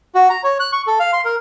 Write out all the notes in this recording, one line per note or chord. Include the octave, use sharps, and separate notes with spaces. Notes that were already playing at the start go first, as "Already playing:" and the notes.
F#4
A#5
C#5
F#6
C#6
A4
F5
C6
A#4